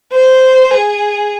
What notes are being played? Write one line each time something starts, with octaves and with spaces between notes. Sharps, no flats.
C5
G#4